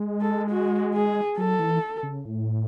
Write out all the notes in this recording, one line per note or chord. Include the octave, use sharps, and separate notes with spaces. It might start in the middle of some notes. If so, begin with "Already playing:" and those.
Already playing: G#3
A4
F#4
G#4
F#3 A4
E3
C#3
A2